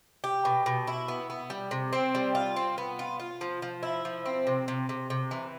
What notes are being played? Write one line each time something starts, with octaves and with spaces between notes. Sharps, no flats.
G4
B2
B2
E4
B3
B3
G3
C3
C4
G3
F4
C4
B3
F4
F4
F3
F3
E4
F3
C4
C3
C3
C3
C3
E3